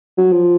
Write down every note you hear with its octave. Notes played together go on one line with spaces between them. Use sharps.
F#3
F3